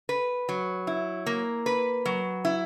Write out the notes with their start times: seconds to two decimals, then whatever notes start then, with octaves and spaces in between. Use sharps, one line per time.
0.09 B4
0.49 F#3
0.87 E4
1.26 A#3
1.66 B4
2.06 F#3
2.45 E4